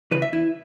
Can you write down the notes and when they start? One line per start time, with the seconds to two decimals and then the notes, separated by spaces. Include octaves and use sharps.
0.11 C#3 E3 B4
0.22 E5
0.32 E2 E4